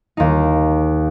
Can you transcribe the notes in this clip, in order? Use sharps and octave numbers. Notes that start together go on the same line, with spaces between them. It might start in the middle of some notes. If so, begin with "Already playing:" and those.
D#2 D#4